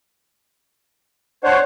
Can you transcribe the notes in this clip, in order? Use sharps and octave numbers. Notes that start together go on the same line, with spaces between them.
D4 C5 C#5 F#5